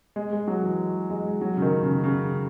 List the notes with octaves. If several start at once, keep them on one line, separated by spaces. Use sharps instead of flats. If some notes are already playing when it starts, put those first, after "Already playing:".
G#3
G#3
F#3
E3
G#3
F#3
C#3
D#3
C#3
C#3